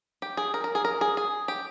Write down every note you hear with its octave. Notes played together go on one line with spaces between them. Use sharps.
G4
G#4
A#4
A#4
G#4
A#4
G#4
G#4
G4